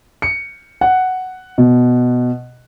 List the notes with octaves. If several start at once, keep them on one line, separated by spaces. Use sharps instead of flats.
C#7
F#5
B2